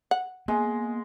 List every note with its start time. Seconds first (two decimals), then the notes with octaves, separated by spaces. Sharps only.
0.11 F#5
0.48 G#3 A#3 B3